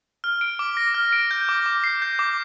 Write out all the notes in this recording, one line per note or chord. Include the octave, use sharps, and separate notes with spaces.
F6
D7
D6
A#6
F6
D7
G6
D6
D6
C7
G6
D6